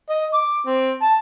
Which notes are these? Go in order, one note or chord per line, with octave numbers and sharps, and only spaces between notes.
D#5
D6
C4
A5